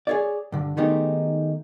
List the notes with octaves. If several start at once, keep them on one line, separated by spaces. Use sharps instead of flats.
G#4 C#5 D5
G2 D3
D#3 G#3 A3 B3 D#4 G4